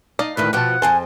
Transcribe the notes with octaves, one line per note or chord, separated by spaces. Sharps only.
D#4 D5 D#5 F5
D2 A2 D#3 B4
B2 F3 G4 F#5 A5
F2 G#4 C5 G#5 A5